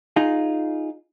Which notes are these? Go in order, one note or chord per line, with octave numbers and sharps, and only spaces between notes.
D#4 F4 G#4